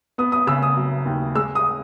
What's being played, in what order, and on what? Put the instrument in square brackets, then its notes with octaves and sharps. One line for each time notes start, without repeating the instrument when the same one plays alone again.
[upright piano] B3 D#6
D#6
C#3 E6
D#6
F#3
D#2
G#3 E6
D#6